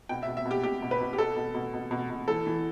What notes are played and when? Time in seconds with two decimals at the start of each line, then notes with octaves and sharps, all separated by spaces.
0.09 B2 G5
0.23 E5
0.27 B2
0.37 E5
0.46 B2
0.51 G4
0.63 B2 G4
0.82 B2
0.91 B4
1.00 B2
1.13 G4
1.18 B2 A4
1.36 B2
1.55 B2
1.74 B2
1.91 B2
2.10 B2
2.28 E3 A4
2.46 E3